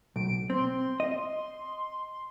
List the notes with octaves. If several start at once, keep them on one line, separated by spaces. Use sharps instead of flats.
B1 D7
C4 C6
D#5